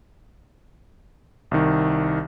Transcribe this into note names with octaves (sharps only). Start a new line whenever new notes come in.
C2 D#3